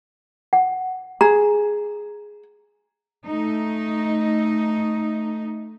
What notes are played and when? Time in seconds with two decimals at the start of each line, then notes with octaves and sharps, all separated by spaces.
0.53 F#5
1.21 G#4 A#5
3.26 A3 D#4